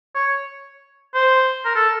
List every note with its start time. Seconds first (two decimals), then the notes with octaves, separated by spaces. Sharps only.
0.15 C#5
1.15 C5
1.65 A#4
1.75 A4